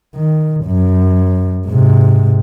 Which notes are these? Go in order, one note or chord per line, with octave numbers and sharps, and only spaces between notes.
D#3
F#2
G#2 C3